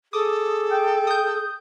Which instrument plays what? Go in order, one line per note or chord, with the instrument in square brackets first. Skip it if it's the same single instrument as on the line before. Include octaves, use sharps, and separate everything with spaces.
[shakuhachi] G#4 [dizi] A4 [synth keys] D6 D#6
[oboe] G5
[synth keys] D#6 G6